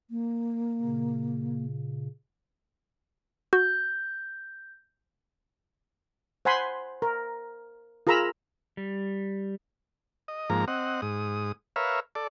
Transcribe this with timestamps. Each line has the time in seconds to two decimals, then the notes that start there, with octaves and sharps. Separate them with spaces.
0.10 A#3
0.81 A#2 C#3
3.53 F#4 G6
6.45 C5 F#5 G#5 B5 C6
7.02 A#4
8.07 F4 G#4 A#4 A#5 B5 E6
8.77 G3
10.28 D#5
10.50 G#2 F3 A#3 A#5
10.68 C4 D#5 F#5
11.02 G#2 D#6
11.76 A#4 B4 C#5 E5 F5
12.15 A4 D5